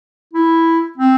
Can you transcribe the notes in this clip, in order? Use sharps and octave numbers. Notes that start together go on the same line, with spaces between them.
E4
C4